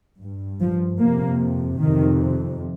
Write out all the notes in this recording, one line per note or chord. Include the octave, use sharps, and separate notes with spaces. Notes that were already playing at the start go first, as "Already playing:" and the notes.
G2
F3
F2 C3 A#3
F2 C3 D#3